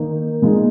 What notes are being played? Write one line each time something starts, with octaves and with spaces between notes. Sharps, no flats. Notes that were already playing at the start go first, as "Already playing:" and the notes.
Already playing: D#3 A#3 D#4
A#2 G#3 D#4